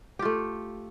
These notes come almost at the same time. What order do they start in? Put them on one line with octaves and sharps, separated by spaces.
G4 F4 A3